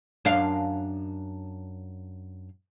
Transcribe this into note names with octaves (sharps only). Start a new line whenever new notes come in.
F#2 D4 F5